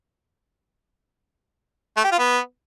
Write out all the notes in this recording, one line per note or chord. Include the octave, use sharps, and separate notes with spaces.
A3
G4
F4
B3